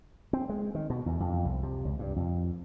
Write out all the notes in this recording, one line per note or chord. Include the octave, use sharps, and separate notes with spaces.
C4
G#3
D#3
B2
E2
F2
C2
C3
C#2
G2
F2